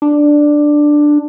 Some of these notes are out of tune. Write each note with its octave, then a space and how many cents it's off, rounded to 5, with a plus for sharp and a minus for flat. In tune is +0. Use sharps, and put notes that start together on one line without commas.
D4 +5